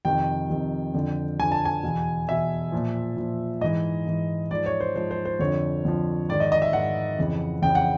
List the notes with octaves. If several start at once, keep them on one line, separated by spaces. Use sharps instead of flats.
F2 C3 D#3 G5
F2 C3 D#3
F2 D3 F3
F2 D3 F3 G#5
A5
G#5
E2 B2
E2 B2 E5
A#2 F3
A#2 F3
G#2 E3 D#5
G#2 E3
G#2 F3 D5
C#5
C5
G#2 F3 C5
C5
C5
F2 D3 F3 C#5
F2 D3 F3
G#2 D#3 D5
D#5
D#5
E5
G#2 D#3 F#5
F2 C#3 E3
F2 C#3 E3 G5
F#5